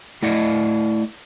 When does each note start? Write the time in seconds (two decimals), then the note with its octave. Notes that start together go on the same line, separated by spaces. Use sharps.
0.22 A3 E4 D5 D#5 F#5